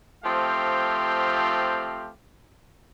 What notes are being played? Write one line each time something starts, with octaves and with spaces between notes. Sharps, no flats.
F3 A3 C4 G4 F5